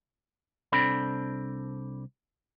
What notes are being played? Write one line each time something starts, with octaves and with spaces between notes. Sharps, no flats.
C2 C4 D4 A4 B5